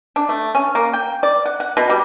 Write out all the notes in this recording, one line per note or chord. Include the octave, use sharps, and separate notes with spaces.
D4
A3
C#4
A#3
G5
D5
F#5
F#5
B2
G3